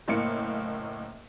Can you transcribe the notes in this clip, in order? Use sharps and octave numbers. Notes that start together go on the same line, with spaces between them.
F#1 A2 A#3 C#7